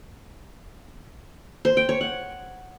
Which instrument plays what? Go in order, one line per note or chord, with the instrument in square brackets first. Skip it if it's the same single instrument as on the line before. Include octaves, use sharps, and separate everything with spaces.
[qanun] C5
G5
C#5
F#5